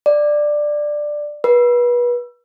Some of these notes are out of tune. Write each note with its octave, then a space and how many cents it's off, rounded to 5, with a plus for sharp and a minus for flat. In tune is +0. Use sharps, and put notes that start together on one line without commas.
D5 +10
B4 -30